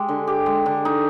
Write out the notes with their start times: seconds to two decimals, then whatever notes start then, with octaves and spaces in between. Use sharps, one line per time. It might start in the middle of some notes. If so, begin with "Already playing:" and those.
Already playing: G#3 G4
0.09 D3
0.27 G4
0.46 G#3
0.66 D3
0.85 D#4